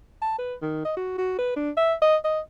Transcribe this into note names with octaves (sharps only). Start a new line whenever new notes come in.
A5
B4
D#3
D#5
F#4
F#4
B4
D4
E5
D#5
D#5